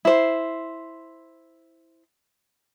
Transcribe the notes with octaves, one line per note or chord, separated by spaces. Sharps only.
E4 C5